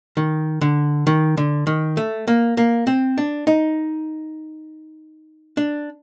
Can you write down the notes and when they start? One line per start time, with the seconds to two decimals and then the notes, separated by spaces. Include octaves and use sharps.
0.17 D#3
0.61 D3
1.07 D#3
1.37 D3
1.67 D#3
1.97 A3
2.27 A#3
2.57 A#3
2.87 C4
3.18 D4
3.47 D#4
5.57 D4